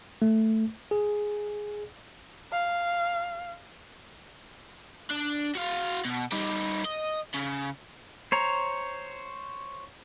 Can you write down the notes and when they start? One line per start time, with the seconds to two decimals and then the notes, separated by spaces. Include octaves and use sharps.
0.22 A3
0.91 G#4
2.52 F5
5.11 D4
5.55 F#4 F5
6.05 B2
6.32 G3 D#4
6.85 D#5
7.34 C#3
8.32 C5 C#5 A#5